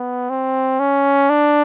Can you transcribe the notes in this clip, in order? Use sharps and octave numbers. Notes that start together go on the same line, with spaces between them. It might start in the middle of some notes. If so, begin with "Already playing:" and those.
Already playing: B3
C4
C#4
D4